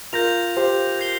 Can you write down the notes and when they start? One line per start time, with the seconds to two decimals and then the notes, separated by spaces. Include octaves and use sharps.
0.13 F4 A#4 G6 A#6 F7
0.57 G4 C5
1.00 G6 C7 G7